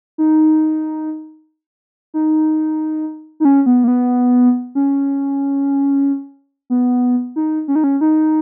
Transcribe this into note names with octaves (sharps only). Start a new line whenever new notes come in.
D#4
D#4
D#4
C#4
B3
A#3
B3
C#4
B3
D#4
C#4
D#4
C#4
D#4